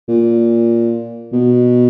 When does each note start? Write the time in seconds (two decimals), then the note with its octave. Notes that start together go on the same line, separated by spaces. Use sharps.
0.08 A#2
1.33 B2